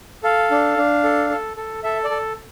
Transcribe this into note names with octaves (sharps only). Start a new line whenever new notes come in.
A4 F5
D4
D4
A4
A4
A4
A4 E5
D5
A4